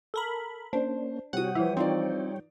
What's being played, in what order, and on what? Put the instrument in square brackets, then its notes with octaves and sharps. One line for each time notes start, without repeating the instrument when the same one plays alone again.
[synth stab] A4 A#4 B5
[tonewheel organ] A#3 C#4 [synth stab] D4 [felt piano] C5
[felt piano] C3 F#4 [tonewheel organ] G3 C#5 G5 [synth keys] F#5 D#6
[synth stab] E3 F3 [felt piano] E4
[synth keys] C4 [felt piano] D#4 F4 D5